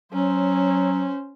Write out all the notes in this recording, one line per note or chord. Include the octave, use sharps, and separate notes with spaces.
F#3 C#4 C5